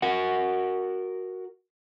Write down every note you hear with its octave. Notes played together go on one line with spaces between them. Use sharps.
F#4 A#4 F#5